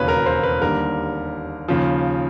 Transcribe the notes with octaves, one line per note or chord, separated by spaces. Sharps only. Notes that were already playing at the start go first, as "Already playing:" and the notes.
Already playing: E1 D#2 C#3 F#3 B4 C#5
A#4
C5
B4
D#2 D3 G3 A#4
D#2 C#3 F3